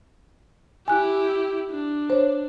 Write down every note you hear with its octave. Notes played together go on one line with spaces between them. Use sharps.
E4 G4 G#5 F#6
D4
C5 C#5